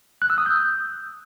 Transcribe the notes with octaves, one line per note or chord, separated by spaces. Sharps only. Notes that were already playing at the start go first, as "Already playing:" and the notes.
F#6
E6
D#6
G6